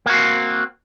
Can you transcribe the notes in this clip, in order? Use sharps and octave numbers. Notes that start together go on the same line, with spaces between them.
A#3 C4 F#4